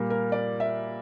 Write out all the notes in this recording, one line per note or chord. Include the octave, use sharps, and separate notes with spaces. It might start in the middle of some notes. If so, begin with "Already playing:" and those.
Already playing: A#2 G3 A#4
A#4
D5
E5